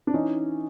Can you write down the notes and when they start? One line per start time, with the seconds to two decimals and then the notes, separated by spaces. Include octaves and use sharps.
0.07 D4
0.14 E3 C#4 D#4